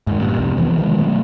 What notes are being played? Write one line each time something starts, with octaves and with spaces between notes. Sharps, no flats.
G#2 D#3
G2 A#2
C2 F2 C3
C3 E3 F3 B3
D#3 F3 F#3 G#3
B2 F#3 A3 B3